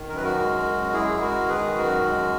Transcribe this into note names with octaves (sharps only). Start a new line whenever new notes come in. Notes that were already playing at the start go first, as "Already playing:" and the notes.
Already playing: D#3
F#2 A#4
B4
F#4 A#4
G#3
F#2
G#3 E4 G#4
G#4
G#3 F#4 A#4
D#3 G#4 B4
F#2 F#4 A#4
G#3